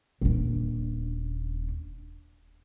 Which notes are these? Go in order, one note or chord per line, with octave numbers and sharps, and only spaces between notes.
D#1 D4